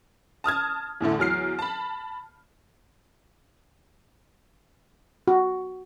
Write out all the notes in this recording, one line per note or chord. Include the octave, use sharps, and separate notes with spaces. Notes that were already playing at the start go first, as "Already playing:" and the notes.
A5 D#6 F6 G#6
E2 A2 D3 A3
E2 F#3 F6 C7
A5 B5
F#4